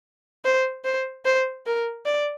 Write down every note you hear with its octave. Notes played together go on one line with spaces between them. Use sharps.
C5
C5
C5
A#4
D5